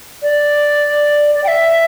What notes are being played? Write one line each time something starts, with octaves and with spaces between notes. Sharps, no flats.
D5
D5
G5
E5